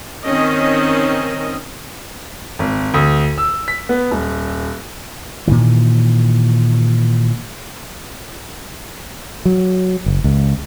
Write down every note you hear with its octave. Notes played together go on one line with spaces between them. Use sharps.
D#3 C4 C#4 D#5
G#1
D2
E6
B6
B3
D#1
A#2 D#3 E3
F#3
F#1
C#2